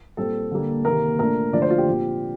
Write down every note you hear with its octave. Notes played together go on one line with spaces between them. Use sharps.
A#2 G3 C4 A4
D3 G3 A#3
C3 D#3 A#3 A#4
A#2 A3 D4 A#4
D3 F3 A3 D4 D5
C5
F4
G4
A#2 F3 C4